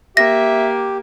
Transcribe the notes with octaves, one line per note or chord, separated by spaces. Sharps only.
A#3 G4 E5 A#6